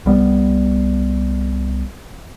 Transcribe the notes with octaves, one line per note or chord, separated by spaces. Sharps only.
C2 G3 B3